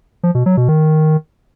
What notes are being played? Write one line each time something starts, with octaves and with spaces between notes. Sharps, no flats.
F3
B2
F#3
B2
D#3